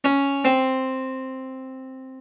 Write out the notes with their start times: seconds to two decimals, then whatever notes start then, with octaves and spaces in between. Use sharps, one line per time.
0.04 C#4
0.45 C4